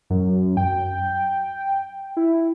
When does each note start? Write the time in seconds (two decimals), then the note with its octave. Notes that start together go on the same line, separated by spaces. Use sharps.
0.10 F#2
0.57 G5
2.17 E4